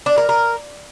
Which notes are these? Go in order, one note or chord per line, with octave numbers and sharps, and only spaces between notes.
D4
A#4
A#4